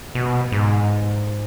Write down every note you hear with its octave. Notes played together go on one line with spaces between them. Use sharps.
B2
G#2